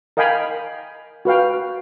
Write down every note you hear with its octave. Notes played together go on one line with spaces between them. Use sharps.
A#4 D#5 F5 G5 G#5 B5
F#4 B4 F5 G5